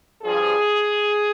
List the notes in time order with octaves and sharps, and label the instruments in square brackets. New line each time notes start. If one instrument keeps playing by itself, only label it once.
[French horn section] G2 F3 G#4